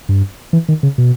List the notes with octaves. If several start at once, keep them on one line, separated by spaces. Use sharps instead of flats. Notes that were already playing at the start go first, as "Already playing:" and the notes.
G2
E3
D#3
C#3
B2